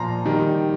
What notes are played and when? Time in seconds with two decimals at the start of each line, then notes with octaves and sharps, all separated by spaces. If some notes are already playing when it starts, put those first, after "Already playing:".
Already playing: A#2 F3 A#5 C6
0.25 D#3 G3